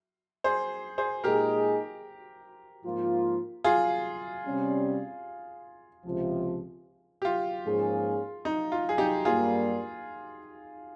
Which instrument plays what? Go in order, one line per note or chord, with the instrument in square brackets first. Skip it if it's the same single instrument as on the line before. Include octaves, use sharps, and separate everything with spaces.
[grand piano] G#4 C5
G#4 C5
[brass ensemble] A#2 G#3 D#4 G#4 [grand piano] G4 A#4
[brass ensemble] G#2 F3 A#3 F4
[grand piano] F4 G#4
[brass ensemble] C3 G3 C#4
C#2 C3 F3
[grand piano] G4
F4
[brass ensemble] G#2 F3 A#3 C#4 G#4
[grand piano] D#4
F4
G#4
D#4 G4
[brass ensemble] G2 G3 A#3 [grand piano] F4 G#4